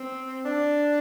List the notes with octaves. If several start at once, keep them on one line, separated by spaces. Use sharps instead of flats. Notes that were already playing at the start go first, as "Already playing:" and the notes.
Already playing: C4
D4